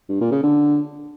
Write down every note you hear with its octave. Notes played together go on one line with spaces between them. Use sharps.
G2
A#2
C#3
D3